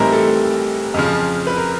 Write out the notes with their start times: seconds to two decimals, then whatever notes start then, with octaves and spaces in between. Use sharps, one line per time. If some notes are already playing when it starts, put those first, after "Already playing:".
Already playing: A2 E3 G3 C4 D#4 A#4
0.12 A4
0.94 F2 C#3 F3
1.47 B4
1.57 A#4